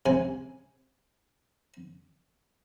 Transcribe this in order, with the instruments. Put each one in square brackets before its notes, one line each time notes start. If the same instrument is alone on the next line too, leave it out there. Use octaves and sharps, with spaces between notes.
[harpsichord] C3 G#5